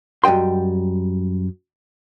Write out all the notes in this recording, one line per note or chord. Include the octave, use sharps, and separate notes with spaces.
F#2 G3 D#5 G5 C6